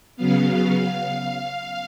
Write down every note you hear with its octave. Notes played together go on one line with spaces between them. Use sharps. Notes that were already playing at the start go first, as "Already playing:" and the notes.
C#3 F#3 B3 F5